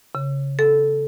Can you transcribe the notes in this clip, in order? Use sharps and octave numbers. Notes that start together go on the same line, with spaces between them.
C#3
A4